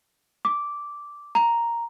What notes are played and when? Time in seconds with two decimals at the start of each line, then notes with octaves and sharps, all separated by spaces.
0.45 D6
1.35 A#5